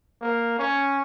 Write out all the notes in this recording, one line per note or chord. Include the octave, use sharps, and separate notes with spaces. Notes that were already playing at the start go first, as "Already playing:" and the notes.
A#3
C#4